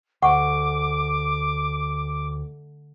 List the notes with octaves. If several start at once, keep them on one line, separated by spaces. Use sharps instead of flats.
D2 F#5 C#6 D6